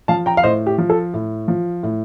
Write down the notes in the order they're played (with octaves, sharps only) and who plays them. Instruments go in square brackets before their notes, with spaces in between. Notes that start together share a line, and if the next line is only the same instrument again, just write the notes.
[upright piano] F3 F5 A5
G5 A#5
F5
A2 C5 D#5
G4
F3
A4
A2
F3
A2